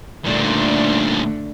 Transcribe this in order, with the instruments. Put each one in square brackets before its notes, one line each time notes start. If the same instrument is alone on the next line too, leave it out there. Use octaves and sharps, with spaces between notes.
[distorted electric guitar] A#2 G3 [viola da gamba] D3 A3 D4